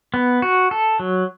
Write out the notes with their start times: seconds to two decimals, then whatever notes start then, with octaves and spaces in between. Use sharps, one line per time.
0.14 B3
0.42 F#4
0.71 A4
1.00 F#3